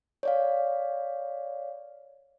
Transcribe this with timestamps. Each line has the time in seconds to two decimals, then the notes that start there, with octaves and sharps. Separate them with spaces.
0.23 C#5 D5 F5